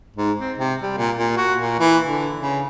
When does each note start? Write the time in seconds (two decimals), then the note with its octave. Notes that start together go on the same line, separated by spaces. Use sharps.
0.16 G#2
0.40 C4
0.58 C3
0.82 G3
0.97 A#2
1.17 A#2
1.37 F#4
1.60 A#2
1.80 E3
2.05 D3
2.40 C#3